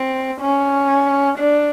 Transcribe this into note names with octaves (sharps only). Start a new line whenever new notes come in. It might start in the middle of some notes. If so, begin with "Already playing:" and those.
Already playing: C4
C#4
D4